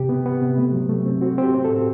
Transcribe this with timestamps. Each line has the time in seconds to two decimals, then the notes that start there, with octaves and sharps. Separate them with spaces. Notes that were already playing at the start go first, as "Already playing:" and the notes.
Already playing: C3 G4
0.09 B3
0.26 B3
0.41 C3
0.58 A3
0.73 F#3
0.89 A3
1.06 C4
1.21 C4 F#4
1.38 C4
1.43 G4
1.54 C4
1.64 A4
1.70 A2